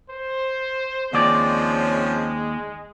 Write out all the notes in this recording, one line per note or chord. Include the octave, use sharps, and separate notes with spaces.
C5
D#2 F3 G#3 C4 C#4 D5